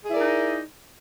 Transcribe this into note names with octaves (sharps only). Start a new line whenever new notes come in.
D#4 E4 G#4 A#4 D5